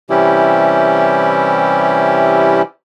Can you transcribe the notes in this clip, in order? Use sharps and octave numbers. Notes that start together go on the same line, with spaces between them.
C3 E3 G3 C#4 E4 G4